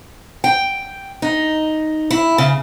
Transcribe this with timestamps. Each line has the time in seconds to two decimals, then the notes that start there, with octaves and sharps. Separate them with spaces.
0.44 G5
1.22 D#4
2.11 E4
2.38 C#3